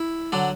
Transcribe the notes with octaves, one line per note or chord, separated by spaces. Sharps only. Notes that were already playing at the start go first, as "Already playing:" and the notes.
Already playing: E4
D3 F#3 D4